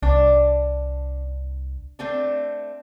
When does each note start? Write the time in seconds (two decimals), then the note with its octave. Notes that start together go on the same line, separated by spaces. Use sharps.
0.02 C2 D4
1.99 A3 C4 D4